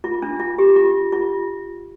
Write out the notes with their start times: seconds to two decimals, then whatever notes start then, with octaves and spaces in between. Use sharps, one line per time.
0.04 F4
0.22 D4
0.40 F4
0.58 G4
0.76 F4
1.12 F4